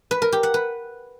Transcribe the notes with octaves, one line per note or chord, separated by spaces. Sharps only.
B4
A#4
G4
F#5
B4